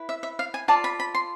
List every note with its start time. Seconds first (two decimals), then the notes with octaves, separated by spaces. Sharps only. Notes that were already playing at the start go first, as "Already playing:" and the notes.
Already playing: E4 B4
0.09 E5
0.23 E5
0.39 F5
0.54 G#5
0.68 F4 A4 D5 A5
0.84 B5
1.00 B5
1.15 C6